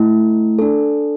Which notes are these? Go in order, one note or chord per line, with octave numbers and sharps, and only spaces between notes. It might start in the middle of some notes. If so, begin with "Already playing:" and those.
Already playing: A3 E4
D4 A4